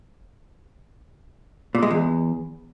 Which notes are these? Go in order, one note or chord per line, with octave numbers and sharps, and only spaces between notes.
A#2
G#3
E2